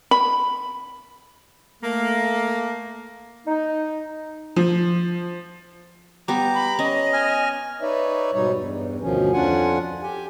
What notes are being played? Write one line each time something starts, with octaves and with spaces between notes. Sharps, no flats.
B5
A3 A#3
D#4
F3
G3 B3 G4 A#5 D6
B5
C#4 D#5
G#5 F6
D#4 B4 C#5 D5 E5
G#2 B2 G3 D#4 C#5
E2 G2
D2 B2 D#3 F3 C#4
F2 C#4 D4 F4 F#5 G#5
G4 G#5